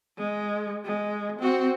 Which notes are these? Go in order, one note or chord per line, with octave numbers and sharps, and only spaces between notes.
G#3
G#3
C4 F#4